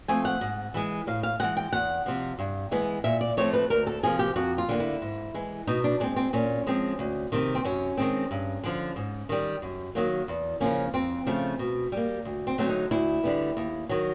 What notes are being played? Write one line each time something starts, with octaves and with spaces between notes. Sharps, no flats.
F3 A3 C4 G#5
F#5
G#2
E3 G#3
A2 F5
F5
E3 G#3 F#5
G5
E2 F#5
C3 F3
G2
E3 G#3 B3
A#2 E5
D5
F3 A3 C4 C#5
B4
D2 A#4
A4
C3 F3 A#3 G#4
G4
F2 F#4
F4
D3 G3 A#3
E4
G#2
E3 G#3
B2 D#4
D4
G#3 C4 D4
C4
A#2 C#4
F3 G#3 C4
D2
C3 D#3
C4
F#2 C#4
D#3 G#3 C4
G2
D3 F3
G#2
D#3 G3
F#2
D#3 F#3 A#3
E2
C#3 F3 A#3 C#4
F2 C4
C#3 F3 A3
B2
G3 A#3
D2
C4
D3 F#3 A3 C4
D#4
D2 E4
D3 G3 B3
D#2
D#3 F#3